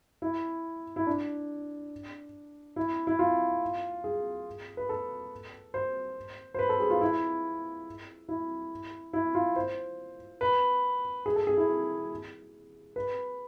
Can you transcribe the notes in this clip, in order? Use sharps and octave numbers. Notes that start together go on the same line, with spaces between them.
E4
E4
D4
E4
E4
F4
G#4
B4
A4
C5
C5
B4
A4
G#4
F4
E4
E4
E4
F4
C5
B4
G#4
A4
G#4
E4
B4